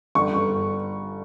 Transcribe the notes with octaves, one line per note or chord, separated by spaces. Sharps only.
G1 C#6
G1